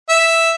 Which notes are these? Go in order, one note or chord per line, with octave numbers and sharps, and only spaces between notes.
E5